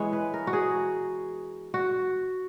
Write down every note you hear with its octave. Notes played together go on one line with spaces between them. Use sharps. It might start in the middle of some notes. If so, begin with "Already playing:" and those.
Already playing: E3 G#3 B3 C#5
B4
A#4
F#4
G#4
F#4